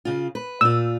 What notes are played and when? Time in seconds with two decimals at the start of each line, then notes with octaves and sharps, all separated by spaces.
0.05 C#3 F4
0.35 B4
0.61 A#2 F4 E6